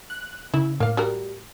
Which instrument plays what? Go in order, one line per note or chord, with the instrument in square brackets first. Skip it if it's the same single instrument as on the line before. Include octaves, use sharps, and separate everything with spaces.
[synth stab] F#6
[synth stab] C#3 [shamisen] E4
[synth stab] A2 [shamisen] A#3 F5
[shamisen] G3 F#4 A#4